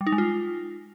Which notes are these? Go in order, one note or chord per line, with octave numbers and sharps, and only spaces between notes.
G3
D#4
G#3
F4